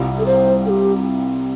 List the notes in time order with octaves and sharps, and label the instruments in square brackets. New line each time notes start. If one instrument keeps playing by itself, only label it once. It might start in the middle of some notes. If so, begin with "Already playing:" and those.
Already playing: [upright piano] C2 C3 G3 F4
[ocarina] A4
C5
A4
G4